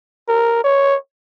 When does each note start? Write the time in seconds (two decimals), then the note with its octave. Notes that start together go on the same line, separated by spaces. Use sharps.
0.28 A#4
0.64 C#5